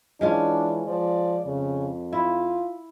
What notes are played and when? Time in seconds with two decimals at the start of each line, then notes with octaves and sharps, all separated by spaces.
0.21 E3 G#3 C#4 D4 F4
0.88 F3 D5
1.45 F2 C#3
2.12 E4 F4